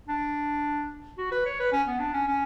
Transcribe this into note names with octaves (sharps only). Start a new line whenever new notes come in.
D4
F#4
B4
C#5
B4
C#4
B3
D4
C#4
C#4